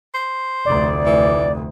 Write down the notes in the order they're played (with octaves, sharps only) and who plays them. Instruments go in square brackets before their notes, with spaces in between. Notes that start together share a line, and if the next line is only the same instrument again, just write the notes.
[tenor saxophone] C5
[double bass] F1 D2 [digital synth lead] D5
[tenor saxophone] E3